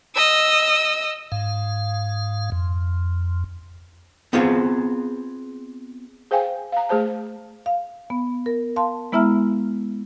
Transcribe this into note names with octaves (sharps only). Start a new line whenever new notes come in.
D#5 E6
G#2 F5
F2
B3 C4 F4 G#4
G#4 C5 F5 G5 G#5
F5 A#5
A3 G#4 C5 A5
F5
B3
A#4
F5 A5 C6
G#3 B3 E4 E5 A#5 F6